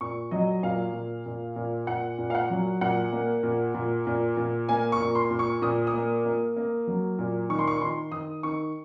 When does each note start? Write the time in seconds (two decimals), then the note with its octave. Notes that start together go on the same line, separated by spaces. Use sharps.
0.01 A#2 C#6
0.31 F#3 D#5
0.63 A#2 F5
0.94 A#2
1.26 A#2
1.56 A#2
1.87 A#2 F#5
2.19 A#2
2.30 F5
2.35 F#5
2.50 F#3
2.81 A#2 F#5
3.13 A#3
3.43 A#2
3.75 A#2
4.07 A#2
4.37 A#2
4.69 A#3 G#5
4.92 C#6
5.00 A#2
5.15 C6
5.31 A#2
5.39 C#6
5.62 A#2 D#6
5.87 D#6
5.94 A#3
6.25 A#3
6.57 A#3
6.87 F#3
7.19 A#2
7.49 D#3 C#6
7.59 C6
7.67 C#6
7.81 D#3 C6
8.12 D#3 D#6
8.43 D#3 C#6